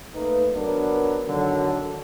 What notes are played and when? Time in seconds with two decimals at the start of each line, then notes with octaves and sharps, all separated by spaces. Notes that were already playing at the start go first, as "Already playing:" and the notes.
0.14 A3 A#3 D#4 B4
0.54 F#3 B3 D4 A#4
1.27 D3 D#3 F#3